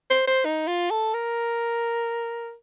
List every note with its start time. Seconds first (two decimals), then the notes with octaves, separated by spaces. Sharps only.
0.10 C5
0.28 C5
0.45 D#4
0.67 F4
0.90 A4
1.14 A#4